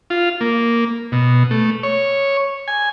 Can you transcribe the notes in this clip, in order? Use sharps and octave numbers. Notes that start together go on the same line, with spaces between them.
F4
A#3
B2
A3
C#5
G#5